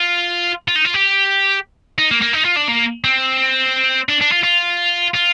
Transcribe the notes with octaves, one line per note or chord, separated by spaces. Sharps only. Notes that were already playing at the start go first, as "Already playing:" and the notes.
Already playing: F4
F4
D#4
F4
G4
D#4
A#3
A#3
D#4
F4
D4
A#3
C4
D4
D4
F4
F4
F4